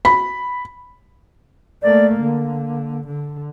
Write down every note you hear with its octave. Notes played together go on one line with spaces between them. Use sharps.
B5
A3 A#3 D5
D3 A#3
D3